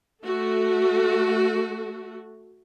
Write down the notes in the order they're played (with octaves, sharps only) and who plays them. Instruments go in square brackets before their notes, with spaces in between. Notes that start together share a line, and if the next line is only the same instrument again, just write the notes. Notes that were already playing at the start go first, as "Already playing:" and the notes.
[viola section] A3 F#4 A4